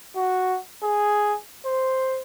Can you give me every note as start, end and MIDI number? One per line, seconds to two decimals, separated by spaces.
0.16 0.58 66
0.83 1.35 68
1.66 2.22 72